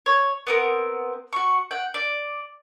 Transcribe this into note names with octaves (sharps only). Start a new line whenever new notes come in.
C#5
B3 C4 A#4
F#4 C#6
F#5 G5
D5